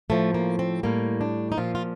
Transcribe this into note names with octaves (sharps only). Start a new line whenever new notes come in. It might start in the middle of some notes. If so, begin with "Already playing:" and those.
A2 F3 A3
A#3
C4
A2 G3 A#3
D4
D#4
A#2 F3 F4
F4